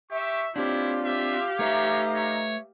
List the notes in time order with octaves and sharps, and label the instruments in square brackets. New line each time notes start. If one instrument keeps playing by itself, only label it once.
[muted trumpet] G4 [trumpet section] E5 C#6
[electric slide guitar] C4 D4 [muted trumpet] E4 [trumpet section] F4 [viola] G4
[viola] G4 F5 [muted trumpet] E5
[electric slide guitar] A3 B4 E5 [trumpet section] D#4 A#5 [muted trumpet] C#5
[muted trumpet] C#5